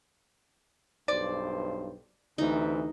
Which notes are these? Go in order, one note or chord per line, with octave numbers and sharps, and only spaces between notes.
B1 G2 C5 D5
D2 C3 E3 D#4